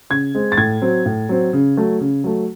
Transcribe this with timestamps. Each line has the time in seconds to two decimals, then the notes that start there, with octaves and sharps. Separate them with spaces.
0.10 C#3 G#6
0.35 G#3 C4
0.52 A6
0.58 A2 G#6
0.82 F#3 C4
1.06 A2
1.29 F#3 C4
1.53 C#3
1.77 F#3 A3
2.01 C#3
2.24 F#3 A3